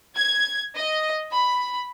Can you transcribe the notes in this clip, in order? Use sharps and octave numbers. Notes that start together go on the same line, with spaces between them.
G#6
D#5
B5